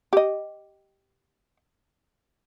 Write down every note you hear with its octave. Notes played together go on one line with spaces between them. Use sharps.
G4 D#5